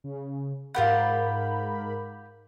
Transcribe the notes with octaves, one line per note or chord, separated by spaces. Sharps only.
C#3
G#2 F4 G4 A#4 F#5 B5